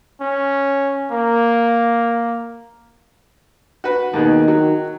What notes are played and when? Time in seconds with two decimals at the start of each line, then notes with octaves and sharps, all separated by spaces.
0.21 C#4
1.12 A#3
3.84 F#4 B4
4.13 D#2 B2 D#3 G#4
4.48 F#3